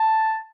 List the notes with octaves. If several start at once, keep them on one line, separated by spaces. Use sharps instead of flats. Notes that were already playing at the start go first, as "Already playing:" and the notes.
Already playing: A5